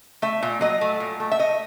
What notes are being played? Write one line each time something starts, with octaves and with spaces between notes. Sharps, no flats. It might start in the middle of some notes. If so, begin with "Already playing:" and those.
A3 E5
A#2
F#3 D#5
A3
A#2
A3
E5
A3 D#5